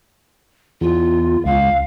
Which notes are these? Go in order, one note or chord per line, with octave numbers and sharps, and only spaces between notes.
E2 F4
C#2 F5